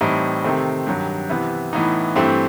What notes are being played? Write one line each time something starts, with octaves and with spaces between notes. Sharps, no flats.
A2 E3 G3 C4 D#4
C3 D#3 A3 C4
G2 D#3 F#3
C3 E3 B3
A2 E3 B3 D#4
G2 E3 A3 C4